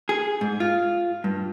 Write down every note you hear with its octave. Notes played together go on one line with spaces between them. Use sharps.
G#4
G#2
F4
G2